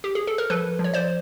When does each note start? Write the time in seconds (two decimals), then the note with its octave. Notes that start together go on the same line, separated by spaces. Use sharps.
0.04 G4
0.15 G#4
0.27 A4
0.38 A#4
0.50 F3 A4 B4
0.79 F3
0.84 C#5
0.93 C5 D5